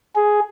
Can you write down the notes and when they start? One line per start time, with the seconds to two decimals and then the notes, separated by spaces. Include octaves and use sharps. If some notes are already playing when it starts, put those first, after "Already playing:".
0.16 G#4